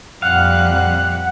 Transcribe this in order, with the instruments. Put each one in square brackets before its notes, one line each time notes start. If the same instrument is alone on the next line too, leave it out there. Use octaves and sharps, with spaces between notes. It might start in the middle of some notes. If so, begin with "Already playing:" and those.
[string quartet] F2 A#2 G3 [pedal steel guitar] F5 [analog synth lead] F#5 [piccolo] F#6